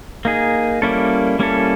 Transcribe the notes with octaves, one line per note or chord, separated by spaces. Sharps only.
A#3 D#4 G#4
G3 A#3 C#4 E4 A4
G3 A#3 C#4 E4 A4